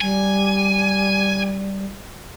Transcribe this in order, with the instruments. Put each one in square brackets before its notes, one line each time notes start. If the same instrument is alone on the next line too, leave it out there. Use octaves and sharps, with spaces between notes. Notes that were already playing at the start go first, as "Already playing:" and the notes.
[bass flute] G3 [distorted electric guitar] G#5